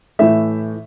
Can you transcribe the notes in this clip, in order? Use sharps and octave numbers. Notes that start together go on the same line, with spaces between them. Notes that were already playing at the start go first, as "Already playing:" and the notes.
A2 E3 A3 E5